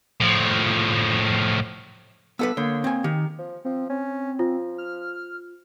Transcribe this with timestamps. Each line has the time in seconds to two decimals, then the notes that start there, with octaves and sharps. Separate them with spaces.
0.20 A2 F3
2.39 B3 A4 B4 E6
2.57 D3 A#3 C#5
2.84 C4 G#5
3.04 D#3 G4
3.39 F3
3.65 F3 C4
3.89 C4 C#4
4.39 F3 F4
4.78 F6